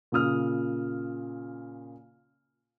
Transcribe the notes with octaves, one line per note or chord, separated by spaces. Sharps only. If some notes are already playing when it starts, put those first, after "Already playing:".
A#2 C#3 D#6 F6